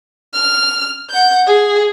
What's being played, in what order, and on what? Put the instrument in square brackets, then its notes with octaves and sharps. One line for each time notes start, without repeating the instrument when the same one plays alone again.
[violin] F6
F#5 G6
G#4